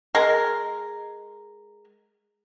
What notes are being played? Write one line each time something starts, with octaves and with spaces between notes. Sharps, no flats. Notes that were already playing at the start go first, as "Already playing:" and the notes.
G#3 A#4